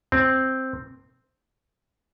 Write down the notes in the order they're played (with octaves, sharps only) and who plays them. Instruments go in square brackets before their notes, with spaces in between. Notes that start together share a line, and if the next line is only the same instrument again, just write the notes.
[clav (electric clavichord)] C4